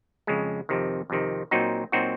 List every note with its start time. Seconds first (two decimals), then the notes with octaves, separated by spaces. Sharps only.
0.27 F2 C#3 G#3
0.69 F2 C3 D#3
1.10 F2 C3 D#3
1.51 A#2 F#3 C4 D#4 F#4
1.92 A#2 F#3 C4 D#4 F#4